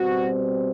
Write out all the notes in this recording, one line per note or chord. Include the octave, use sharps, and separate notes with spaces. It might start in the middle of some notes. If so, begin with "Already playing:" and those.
Already playing: B2 G3 C4 F#4